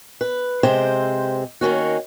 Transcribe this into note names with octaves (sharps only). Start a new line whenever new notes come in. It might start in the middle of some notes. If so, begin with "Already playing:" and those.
B4
C3 G#3 C5 G5
D#3 A#3 C#4 F#4